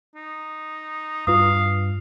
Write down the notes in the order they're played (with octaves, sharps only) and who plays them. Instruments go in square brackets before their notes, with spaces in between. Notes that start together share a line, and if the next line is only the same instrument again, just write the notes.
[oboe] D#4
[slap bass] G2 [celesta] F4 B4 D#6 [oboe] F5